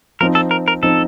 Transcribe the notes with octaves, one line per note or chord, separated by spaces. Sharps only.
F3 C4 D#4 A#4
A4
A#4
A#4
F3 C4 D#4 A4